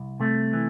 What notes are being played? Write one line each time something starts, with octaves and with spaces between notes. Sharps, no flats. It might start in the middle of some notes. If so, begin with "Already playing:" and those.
Already playing: C2
C3 A3
E3